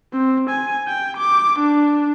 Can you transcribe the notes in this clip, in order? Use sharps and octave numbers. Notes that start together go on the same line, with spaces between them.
C4
G#5
G5
D6
D4